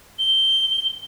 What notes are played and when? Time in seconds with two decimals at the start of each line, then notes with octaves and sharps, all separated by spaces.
0.19 G7